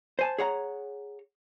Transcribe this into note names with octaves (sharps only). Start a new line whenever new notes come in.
C5 G#5 A5
G#4 C#5 F#5 A#5